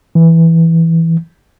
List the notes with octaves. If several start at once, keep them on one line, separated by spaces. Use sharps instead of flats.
E3